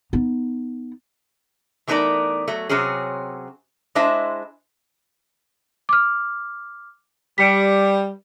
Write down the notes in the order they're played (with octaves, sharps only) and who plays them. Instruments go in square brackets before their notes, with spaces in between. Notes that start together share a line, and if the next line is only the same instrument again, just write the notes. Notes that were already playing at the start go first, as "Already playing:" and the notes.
[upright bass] B3 D#4
[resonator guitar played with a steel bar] E3 A3 B3 D#4 A#4 D5
F#3 A3
C3 F#3 C4 C#4 G#4
G#3 D4 E4 C5 D#5 E5
[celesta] D6 F6
[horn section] G3 [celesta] B6 C#7 D7